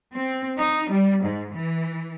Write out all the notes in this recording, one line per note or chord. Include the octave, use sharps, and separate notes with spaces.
C4
D#4
G3
G#2
E3